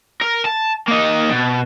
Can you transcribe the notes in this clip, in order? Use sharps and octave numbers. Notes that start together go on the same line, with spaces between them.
A#4
A5
A#3 D#4
B2